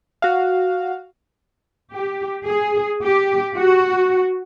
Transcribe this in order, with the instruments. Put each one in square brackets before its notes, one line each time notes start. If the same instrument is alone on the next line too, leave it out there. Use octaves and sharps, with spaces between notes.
[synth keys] F#4 F5
[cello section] G4
G#4
G4
F#4